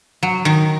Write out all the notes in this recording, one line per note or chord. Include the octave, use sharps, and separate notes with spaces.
F#3
D#3